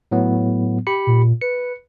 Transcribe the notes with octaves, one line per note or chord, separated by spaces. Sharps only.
A2 F#3 B3
G4 B5 C#7
A#2
B4 C#7